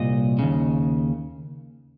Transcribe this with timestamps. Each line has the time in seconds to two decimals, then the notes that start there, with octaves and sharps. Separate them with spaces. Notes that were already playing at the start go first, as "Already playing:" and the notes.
Already playing: C2 A#2 D#5
0.39 D#2 C#3